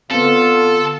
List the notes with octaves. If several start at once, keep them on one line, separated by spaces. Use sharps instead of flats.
D3 B3 C4 F4 A4